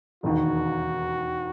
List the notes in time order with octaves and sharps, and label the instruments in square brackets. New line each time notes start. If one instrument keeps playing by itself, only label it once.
[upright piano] E1 D#2 D#3 [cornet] F#4